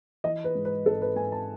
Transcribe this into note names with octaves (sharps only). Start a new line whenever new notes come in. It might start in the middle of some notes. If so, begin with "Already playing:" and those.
E3 D#5
B4
G#2
B4
G#1 A4
B4
G#1 G#5
A5